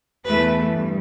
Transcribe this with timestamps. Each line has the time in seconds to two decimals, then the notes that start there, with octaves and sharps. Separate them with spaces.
0.25 E2 E3 A3 B4
0.71 G2